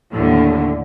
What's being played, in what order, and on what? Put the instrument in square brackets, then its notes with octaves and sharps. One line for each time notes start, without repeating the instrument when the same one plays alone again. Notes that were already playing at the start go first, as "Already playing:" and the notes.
[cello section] D#2 A2 D3